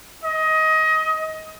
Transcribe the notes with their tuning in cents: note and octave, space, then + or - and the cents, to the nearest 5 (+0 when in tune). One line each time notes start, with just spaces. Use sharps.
D#5 +20